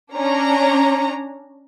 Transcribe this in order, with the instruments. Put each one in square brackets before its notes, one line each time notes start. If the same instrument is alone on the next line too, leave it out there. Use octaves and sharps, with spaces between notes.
[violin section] C#4 D4 A#5